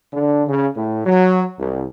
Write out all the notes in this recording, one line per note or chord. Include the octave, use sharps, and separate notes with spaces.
D3
C#3
A2
F#3
C2